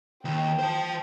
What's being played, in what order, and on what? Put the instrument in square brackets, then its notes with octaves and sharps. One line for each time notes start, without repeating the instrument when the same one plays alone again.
[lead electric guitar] D#2 [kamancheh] G5
[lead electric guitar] C5 A5